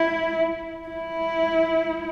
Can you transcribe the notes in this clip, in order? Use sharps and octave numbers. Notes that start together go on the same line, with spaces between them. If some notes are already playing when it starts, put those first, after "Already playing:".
Already playing: E4
E4